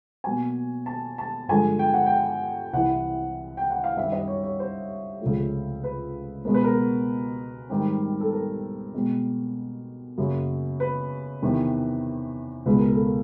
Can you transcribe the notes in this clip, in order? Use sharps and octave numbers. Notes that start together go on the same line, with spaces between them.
B2 F#3 A#3 G#5
A5
A5
G2 D3 F3 G#3 G#5
G5
F#5
G5
C2 C3 E3 F#5
G5
F#5
F5
F#2 D#3 G3 C4 E5
D#5
C#5
C#5
C5
C#2 C3 F3 A3
B4
B2 G#3 B3 A#4
B4
A#4
G#2 D#3 G3 C4
A4
A#4
B2 G#3 C4
F#2 C#3 F#3 A#3
B4
E2 C3 D#3
C#2 B2 G#3 B4
A#4
A4
A#4